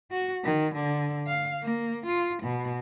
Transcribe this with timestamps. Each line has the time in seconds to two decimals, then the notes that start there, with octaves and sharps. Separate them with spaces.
0.11 F#4
0.44 D#3
0.75 D3
1.27 F5
1.63 A#3
2.06 F4
2.43 B2